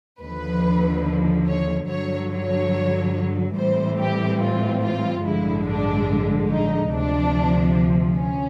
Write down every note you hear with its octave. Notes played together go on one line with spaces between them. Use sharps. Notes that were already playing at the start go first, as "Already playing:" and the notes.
D#2 D3 F3 B4
C#5
G2 D3 F#3 C#5
C#5
A2 E3 G3 C4 C5
G4
F4
F4
A1 G2 D3 F3 G#3 E4
D4
D#4
D2 C3 F3 D4
C#4